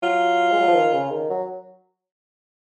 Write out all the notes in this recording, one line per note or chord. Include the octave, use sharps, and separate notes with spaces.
F#3 F4
G#3
F#3
F3
D#3
C#3
D#3
F#3